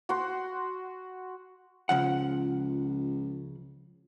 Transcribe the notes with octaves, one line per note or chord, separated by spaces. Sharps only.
F#4 C6
C#2 C#3 F3 F#5